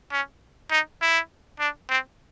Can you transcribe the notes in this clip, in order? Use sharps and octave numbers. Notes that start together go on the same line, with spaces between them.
C#4
D#4
E4
D4
C4